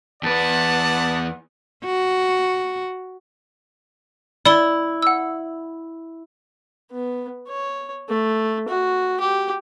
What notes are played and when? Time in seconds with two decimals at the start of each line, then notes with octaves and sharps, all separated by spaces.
0.23 E2 B4 D5 F#5 A5
1.85 F#4
4.45 E4 D5 G7
5.02 F#5 E6
6.91 B3
7.48 C#5
8.09 A3
8.68 F#4
9.20 G4